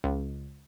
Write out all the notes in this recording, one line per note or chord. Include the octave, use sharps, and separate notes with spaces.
C#2